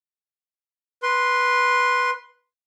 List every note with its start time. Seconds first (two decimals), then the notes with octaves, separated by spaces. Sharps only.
1.03 B4 C6